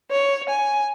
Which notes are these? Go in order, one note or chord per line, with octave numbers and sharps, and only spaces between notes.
C#5
G#5